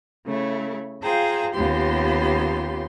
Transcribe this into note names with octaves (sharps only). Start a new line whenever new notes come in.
C#3 A3 E4 C#5
F4 G#4 C5 F5 G5 A#5
D#2 C#3 B3 F4 G4 C6